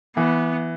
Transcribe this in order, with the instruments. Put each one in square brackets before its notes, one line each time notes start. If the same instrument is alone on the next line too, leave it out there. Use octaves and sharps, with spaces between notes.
[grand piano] E3 [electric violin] B3